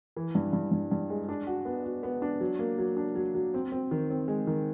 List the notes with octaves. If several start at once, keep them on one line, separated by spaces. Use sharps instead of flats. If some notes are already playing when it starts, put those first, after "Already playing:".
E3
G2
G2
G2
G2
G#3
D4
F#4
B3
F#4
B3
D4
F#3
A#3
F#3
D4
F#3
F#3
C4
C4
D#3
C4
G#3
D#3